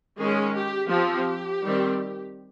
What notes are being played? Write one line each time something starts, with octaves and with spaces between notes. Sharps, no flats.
D#3 G#3 C#4 G#4
G4
F3 C4 G4
D#3 G3 C4